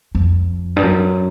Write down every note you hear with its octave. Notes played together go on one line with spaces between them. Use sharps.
F2
G2
F#2